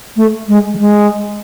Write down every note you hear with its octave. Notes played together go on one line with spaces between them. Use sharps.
A3
G#3
F3
G#3